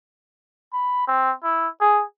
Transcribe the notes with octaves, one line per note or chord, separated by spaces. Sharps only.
B5
C4
E4
G#4